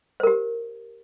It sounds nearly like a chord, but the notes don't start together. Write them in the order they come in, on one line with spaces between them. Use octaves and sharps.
C5 A#4 G4